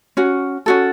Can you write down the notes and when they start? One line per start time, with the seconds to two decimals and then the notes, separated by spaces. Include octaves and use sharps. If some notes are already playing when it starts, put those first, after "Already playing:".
0.17 C#4 F#4
0.66 C#4 F#4 A4